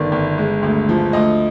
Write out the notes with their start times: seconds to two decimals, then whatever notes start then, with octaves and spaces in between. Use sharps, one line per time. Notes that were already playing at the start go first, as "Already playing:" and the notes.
Already playing: G1 D#3 D5
0.12 G1
0.38 G#3
0.63 D2
0.89 F3
1.13 D2 D#5